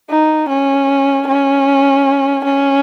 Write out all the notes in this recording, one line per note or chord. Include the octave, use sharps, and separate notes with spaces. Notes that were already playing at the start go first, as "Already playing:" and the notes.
D#4
C#4
C#4
C#4